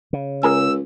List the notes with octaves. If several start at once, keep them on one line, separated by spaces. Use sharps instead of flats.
C#3
C#2 G#4 A#4 G#5 E6